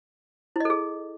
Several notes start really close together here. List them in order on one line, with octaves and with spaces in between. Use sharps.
E4 D#5 A4 G#4